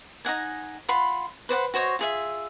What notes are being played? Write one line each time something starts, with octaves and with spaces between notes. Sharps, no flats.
D#4 D#5 F#5 G#5
F4 F#5 B5 C6
B4 C5 D5 F#5
F#4 C5 C#5 D#5
F4 G#4 E5